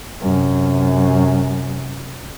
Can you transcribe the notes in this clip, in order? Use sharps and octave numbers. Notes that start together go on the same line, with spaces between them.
F#2 C3